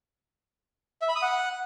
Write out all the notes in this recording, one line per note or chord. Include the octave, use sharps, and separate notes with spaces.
E5
B5
D#6
F#5